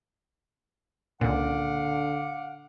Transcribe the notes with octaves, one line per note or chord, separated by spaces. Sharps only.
C#2 A#2 D3 F5 F#5 D6